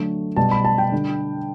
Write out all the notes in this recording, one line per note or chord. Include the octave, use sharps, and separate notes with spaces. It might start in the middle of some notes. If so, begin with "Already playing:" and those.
Already playing: D3 F#3 A3
B2 G3 A5
B5
A5
G5
D3 G3